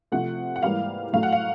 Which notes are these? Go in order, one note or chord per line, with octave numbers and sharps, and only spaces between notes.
C3 F3 A3 F#5
F#5
G#2 E3 G3 A#3 F5
A2 F#3 A3 F5
F#5
F5